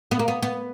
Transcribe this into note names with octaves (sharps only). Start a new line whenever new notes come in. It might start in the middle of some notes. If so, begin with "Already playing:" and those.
B3
A#3
B3
B3